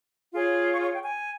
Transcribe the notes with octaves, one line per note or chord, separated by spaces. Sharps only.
F4 G#4 C#5
C#6
C#6
G5
G#5